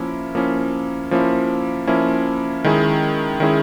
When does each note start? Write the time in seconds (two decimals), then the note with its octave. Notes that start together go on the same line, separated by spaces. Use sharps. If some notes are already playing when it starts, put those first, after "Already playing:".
Already playing: F3 A#3 C#4 E4
0.35 F3 A#3 C#4 E4
1.11 F3 A#3 C#4 E4
1.87 F3 A#3 C#4 E4
2.64 D#3 G#3 C#4 E4 G#4
3.40 D#3 G#3 C#4 E4 G#4